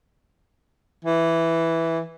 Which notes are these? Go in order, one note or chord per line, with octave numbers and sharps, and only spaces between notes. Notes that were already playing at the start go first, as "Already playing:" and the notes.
E3